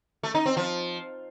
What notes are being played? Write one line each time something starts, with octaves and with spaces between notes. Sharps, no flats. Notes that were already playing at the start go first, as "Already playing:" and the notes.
A3
D#4
C4
F3